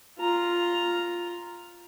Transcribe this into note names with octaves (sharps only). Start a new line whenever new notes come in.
F4 A#5